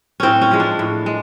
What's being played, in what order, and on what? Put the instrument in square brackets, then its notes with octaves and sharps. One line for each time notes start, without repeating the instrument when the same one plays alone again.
[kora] A2 C4 C#4
C#4
F3 G#3
D4
A2
G#3